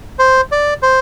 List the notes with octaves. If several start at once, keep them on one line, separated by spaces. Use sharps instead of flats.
C5
D5
C5